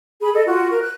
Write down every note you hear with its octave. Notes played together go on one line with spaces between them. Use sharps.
G#4 B5
A4 D#5
F4 F#4
A#4
F#6